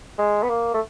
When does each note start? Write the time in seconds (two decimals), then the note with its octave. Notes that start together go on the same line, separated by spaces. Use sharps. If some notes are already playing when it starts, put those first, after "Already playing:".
0.18 G#3
0.43 B3
0.49 A#3
0.74 A3